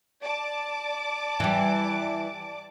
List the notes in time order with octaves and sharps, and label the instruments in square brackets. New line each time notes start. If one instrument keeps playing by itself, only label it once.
[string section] D5 A5 D6
[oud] E3 G3